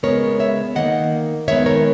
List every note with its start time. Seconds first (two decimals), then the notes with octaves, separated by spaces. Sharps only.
0.03 C#3 G#3 B3 A#4 C#5
0.39 C#5 E5
0.75 D#3 A#3 D#5 F#5
1.48 D#3 G#3 B3 C#5 E5
1.66 A#4 C#5